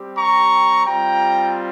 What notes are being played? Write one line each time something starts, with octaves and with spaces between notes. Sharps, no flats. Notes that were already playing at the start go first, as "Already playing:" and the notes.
Already playing: G3 C4 G4
A#5 C#6
G3 C4 F4 G5 A#5